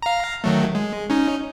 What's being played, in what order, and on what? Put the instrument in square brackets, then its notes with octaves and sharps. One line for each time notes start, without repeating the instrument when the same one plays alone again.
[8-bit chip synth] F5 A#5
D#3 F#3 A3
G#3
C#4 D#4